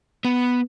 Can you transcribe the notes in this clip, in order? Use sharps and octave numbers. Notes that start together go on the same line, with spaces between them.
B3